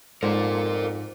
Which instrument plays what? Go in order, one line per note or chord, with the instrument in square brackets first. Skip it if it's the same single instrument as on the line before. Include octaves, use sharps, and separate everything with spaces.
[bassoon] F2 [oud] G#2 A4 C5 [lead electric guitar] A#4 D5